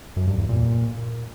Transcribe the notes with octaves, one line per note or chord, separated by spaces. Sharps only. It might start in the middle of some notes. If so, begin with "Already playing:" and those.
F#2
G2
E2
A#2